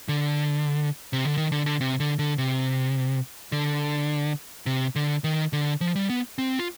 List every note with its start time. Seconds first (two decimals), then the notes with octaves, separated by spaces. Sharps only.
0.08 D3
1.13 C3
1.25 D3
1.37 D#3
1.52 D3
1.66 D3
1.81 C3
2.00 D3
2.19 D3
2.38 C3
3.52 D3
4.66 C3
4.96 D3
5.24 D#3
5.53 D3
5.81 F3
5.96 G3
6.09 B3
6.38 C4
6.59 F4